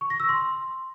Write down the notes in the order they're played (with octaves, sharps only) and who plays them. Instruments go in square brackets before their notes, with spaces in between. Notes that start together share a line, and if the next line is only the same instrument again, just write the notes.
[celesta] C#6
A#6
E6
C6